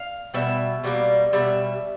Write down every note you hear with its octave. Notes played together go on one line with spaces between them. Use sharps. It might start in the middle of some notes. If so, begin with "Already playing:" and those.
Already playing: F5
B2 G3 E5
B2 G3 A#3
B2 G3 E5